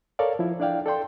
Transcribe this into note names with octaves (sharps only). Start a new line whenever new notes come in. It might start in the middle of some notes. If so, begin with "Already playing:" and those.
A4 A#4 C#5 D5 F5
F3 E4
D4 E4 D5 F5 G5
A4 D5 G5 C6